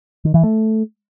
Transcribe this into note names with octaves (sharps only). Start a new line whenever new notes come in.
D#3
E3
A3